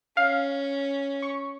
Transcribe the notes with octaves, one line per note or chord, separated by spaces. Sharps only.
C#4 F5
C#6